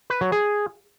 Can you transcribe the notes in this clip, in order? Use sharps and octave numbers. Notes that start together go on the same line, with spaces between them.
B4
F#3
G#4